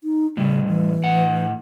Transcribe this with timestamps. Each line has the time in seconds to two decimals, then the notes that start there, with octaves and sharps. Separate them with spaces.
0.04 D#4
0.37 A2 C#3 G3
0.68 E3
1.04 A2 F#5